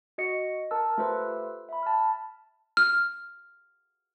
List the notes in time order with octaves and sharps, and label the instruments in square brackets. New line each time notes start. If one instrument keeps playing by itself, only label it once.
[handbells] F#4 D#5 C#7
A#4 A5 E6
A3 F4 G4 B4 C5 E6
E5 B5
A5 F6
[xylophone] F6